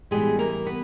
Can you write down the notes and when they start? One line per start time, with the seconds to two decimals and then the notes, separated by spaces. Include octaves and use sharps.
0.11 A2 E3 G3 G#3 B3 G#4
0.39 A#3 A#4
0.66 B3 B4